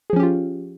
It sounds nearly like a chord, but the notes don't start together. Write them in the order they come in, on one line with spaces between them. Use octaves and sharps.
G#4 F3 C#4 G4 F4